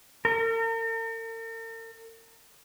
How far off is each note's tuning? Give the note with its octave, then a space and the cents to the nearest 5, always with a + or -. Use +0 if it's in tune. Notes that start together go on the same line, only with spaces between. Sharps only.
A#4 -45